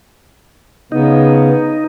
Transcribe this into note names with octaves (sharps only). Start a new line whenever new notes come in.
C#3 B3 D#4